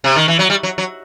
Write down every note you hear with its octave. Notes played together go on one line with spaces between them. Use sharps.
C3
D#3
E3
F#3
G3
F#3
F#3